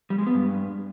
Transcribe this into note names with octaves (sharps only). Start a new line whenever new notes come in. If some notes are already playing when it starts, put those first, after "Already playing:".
G3
G#3
B3
G2